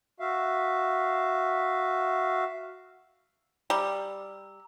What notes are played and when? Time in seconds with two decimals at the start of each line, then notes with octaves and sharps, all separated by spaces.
0.20 F#4 E5 F5
3.70 G3 A#5 E6